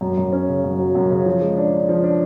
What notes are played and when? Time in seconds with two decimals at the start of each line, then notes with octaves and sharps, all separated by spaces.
0.01 F#2
0.18 F#2
0.32 C#4
0.48 C#3
0.64 F#2
0.79 F#3
0.95 F#2
1.10 C#3
1.26 F3
1.42 G#3
1.57 D4
1.73 D4
1.89 F3
2.04 D4